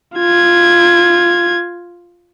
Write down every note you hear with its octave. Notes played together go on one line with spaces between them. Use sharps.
F4 G#6